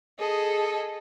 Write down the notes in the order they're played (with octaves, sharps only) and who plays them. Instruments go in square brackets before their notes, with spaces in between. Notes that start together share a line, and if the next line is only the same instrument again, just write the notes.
[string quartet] G#4 A4 D#5